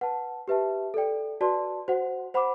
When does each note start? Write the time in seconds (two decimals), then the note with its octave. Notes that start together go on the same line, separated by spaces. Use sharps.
0.01 B4 F#5 A5
0.48 G4 B4 E5 A5
0.94 A4 D5 G5
1.41 F#4 B4 D5 A5 C6
1.88 F#4 C5 F#5
2.34 C5 F#5 B5 D6